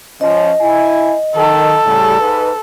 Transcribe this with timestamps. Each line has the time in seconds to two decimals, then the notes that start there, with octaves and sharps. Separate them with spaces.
0.21 F3 C#4 D#5
0.61 E4 G#5
1.35 D#3 A4
1.85 A2 C#3 G3
2.20 G#2 B4